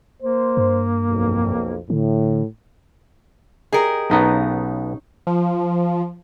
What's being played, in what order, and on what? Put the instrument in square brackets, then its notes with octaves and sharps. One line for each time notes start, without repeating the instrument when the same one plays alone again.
[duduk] A#3 [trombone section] C5
[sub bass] G2
[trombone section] B1 F2
[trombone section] A2 [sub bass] D3
[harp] G4 D#5 [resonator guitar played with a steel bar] G#4 A#4
[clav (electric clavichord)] B1 B3 [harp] C#4 D#4 A#5
[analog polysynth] F3